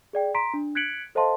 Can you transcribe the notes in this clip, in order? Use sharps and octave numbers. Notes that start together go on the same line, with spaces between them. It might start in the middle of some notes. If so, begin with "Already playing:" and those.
G#4 D5 G5
A#5 C6 B6 D7
D4
F#6 G#6 B6 C#7 D7 F#7
A4 C5 D#5 F5 A5 C6